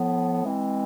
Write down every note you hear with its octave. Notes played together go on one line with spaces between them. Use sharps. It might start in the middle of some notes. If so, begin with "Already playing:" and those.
Already playing: A2 F3 B3
E3 G#3 C4